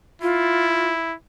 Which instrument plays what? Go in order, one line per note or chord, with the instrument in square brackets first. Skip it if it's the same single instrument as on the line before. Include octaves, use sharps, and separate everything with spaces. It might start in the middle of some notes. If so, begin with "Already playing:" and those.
[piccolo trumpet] E4 [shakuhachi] F4